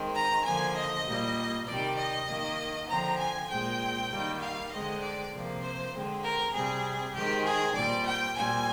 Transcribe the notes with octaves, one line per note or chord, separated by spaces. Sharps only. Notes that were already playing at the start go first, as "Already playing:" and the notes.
Already playing: D#3 G#3 C4
A#5
D3 F3 A#3 G#5
D#5
A#2 G3 A#3
C3 D#3 G3 D5
D#5
D#3 A#3
D3 F3 C4 A#5
G#5
A#2 G#3 C4 G5
D#3 G3 A#3
F5
D3 G#3 C4 D#5
D5
C3 F3 A#3
C5
D3 G#3 C4
A#4
C3 G3 C4 G#4
D#3 G#3 C4 G4
G#4
A#2 G3 C4 D5
G5
A#2 G3 C4 G#5